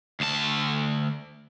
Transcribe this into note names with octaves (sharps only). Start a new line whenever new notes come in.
D2 A5